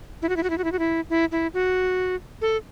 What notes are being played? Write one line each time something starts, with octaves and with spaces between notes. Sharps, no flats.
E4
F#4
E4
F#4
E4
F#4
E4
F#4
E4
E4
E4
F#4
A4